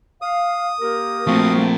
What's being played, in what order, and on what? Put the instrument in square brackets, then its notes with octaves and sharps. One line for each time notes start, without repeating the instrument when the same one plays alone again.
[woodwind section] F5 [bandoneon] D#6
[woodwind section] A#3 G4 A#4
[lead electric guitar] F3 A#3 [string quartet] A3 C4 [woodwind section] F#4 F5